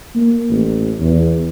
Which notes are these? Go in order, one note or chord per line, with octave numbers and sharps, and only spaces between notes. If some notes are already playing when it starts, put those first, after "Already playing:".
A#3
A1
E2